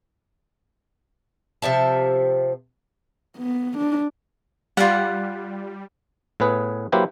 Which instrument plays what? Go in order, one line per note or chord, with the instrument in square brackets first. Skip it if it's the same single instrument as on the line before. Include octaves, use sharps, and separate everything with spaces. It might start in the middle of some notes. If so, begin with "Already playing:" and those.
[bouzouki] C3 F3 E5 A5
[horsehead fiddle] B3
D4
[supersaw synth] G3 [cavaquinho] F4 F#5
[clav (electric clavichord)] A2 B3 G#4 B4
F#3 A#3 E4 G4 B4 C5